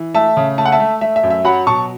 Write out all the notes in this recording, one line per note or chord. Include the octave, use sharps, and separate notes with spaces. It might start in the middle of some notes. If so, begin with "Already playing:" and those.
Already playing: E3
A3 E5 A5
C#3
A3 A5
F#5
E5 A5
A3
A3 E5
E5
F#2
E5
F#3 F#5 B5
B2 A5 C#6